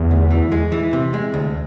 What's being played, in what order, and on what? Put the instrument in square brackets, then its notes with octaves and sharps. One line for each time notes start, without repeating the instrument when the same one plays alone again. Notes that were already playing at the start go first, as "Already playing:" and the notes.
Already playing: [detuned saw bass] E2
[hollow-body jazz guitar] D2
E3
G#3
E3
C3
G#3
D2